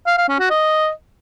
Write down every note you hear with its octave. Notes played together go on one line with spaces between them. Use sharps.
F5
F5
C#4
F#4
D#5